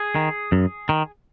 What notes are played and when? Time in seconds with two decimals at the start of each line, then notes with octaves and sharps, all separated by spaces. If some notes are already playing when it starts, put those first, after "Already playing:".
Already playing: G#4
0.15 D#3
0.52 F#2
0.89 D#3